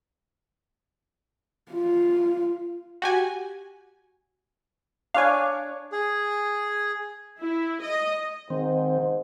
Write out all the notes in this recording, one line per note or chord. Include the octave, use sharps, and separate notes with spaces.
F4
F#4 G4 G#5
D4 C#5 F5 G#5 D6
G#4
E4
D#5
G#2 D#3 C4